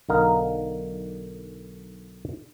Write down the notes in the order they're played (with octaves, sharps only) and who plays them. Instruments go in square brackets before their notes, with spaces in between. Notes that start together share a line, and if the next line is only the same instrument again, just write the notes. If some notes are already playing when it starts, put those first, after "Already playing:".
[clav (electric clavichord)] B1 D3 D#4 A#4 F5